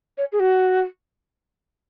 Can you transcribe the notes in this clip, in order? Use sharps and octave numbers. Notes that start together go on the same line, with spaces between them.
C#5
G#4
F#4